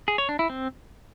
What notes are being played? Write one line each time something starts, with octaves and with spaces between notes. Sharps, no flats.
G#4
C#5
D4
E4
C4